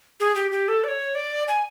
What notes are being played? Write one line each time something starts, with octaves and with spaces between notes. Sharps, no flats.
G#4
G4
G4
A4
D5
C#5
D5
G#5